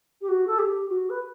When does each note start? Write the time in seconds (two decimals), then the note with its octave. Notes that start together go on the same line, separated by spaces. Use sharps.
0.21 G4
0.29 F#4
0.47 A4
0.59 G4
0.89 F#4
1.10 B4